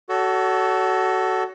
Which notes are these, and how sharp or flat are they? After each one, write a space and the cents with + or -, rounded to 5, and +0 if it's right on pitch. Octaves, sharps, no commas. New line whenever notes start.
F#4 +20 A4 +0 C#5 +40